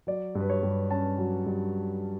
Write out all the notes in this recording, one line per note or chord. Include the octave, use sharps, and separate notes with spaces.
F#3 D5
G2
B4
C#5
G2
C#4 A5
F#3
G2